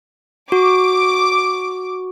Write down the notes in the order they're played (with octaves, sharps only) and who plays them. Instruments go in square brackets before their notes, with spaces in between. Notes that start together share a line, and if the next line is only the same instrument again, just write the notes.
[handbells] F#4 [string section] D6